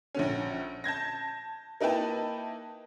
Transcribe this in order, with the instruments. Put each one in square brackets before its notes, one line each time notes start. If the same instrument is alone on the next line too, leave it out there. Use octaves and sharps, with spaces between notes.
[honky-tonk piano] A#1 D3 C#4
A5 G6 G#6 A#6
A#3 D#4 E4 B4 G5 A5